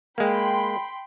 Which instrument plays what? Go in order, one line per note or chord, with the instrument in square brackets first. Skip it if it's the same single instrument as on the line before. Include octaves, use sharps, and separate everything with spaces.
[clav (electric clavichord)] G#3 A#3 [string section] G5 B5 C6